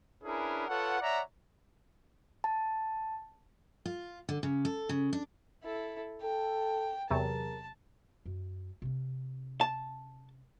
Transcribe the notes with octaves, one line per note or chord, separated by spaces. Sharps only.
C#4 D4 E4 G#4 A#4 B4
F4 A4 B4 C#5 F#5
C#5 D5 E5 F#5 A#5
A5
F4
D3
C#3
A4
C#3
D4
E4 A4
A4 G5
E2 C3 F#3 G#4 A#4 A5
F#2
C3 C#4
A5